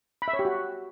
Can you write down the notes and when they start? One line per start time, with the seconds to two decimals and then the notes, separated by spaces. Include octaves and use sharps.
0.22 B5
0.28 E5
0.33 C#5
0.39 G4
0.45 F#4